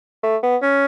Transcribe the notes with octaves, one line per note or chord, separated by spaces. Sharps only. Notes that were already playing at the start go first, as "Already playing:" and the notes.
A3
B3
C#4